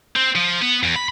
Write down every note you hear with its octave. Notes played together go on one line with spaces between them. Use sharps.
C4
F3
B3
E2
B5